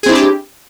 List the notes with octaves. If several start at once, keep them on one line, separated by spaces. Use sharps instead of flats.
C4 D4 E4 G4 G#4